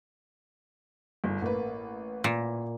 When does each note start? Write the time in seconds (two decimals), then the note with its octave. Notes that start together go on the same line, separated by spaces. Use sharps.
1.24 G1
1.42 A1 A#3 B4
2.24 A#2